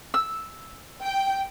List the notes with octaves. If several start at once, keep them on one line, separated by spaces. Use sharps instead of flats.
E6
G5